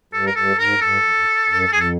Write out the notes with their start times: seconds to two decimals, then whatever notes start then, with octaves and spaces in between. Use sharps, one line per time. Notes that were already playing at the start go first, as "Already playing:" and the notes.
0.13 G2 A4
0.27 A#4
0.35 G2 A4
0.58 G#2 A#4
0.74 F#2
0.81 G2 A4
1.04 F2
1.18 F2
1.49 F#2
1.72 F2 G#4
1.80 A4